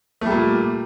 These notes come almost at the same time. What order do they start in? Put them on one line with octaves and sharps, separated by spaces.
A3 G3 A#2